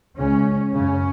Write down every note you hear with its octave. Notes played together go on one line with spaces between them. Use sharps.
C#2 C#3 C#4
F#2 C#3 C#4